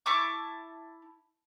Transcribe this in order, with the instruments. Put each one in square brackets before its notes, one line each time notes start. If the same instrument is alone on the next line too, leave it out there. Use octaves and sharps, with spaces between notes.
[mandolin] E4 A5 C#6 D6